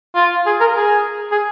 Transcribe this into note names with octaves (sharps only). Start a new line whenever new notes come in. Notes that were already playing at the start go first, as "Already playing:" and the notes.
F4
G#4
A#4
G#4
G#4